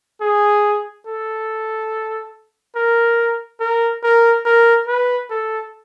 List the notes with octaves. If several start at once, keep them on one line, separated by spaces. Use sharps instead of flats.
G#4
A4
A#4
A#4
A#4
A#4
B4
A4